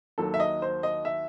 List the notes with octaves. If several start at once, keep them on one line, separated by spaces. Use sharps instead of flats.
D#2 D#3 F#3 A4
E5
D#5
C5
D#5
E5